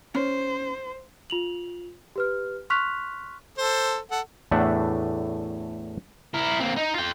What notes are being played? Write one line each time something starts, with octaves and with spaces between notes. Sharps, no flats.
C#4 C5
F4 F7 F#7
G4 B4 F6
C6 C#6 F6 F#6 B6 F7
A4 C5
A4 F#5
E2 A2 A3 D4 E5 F#5
E4 A#4
A#3 C4
D#4
F4 G5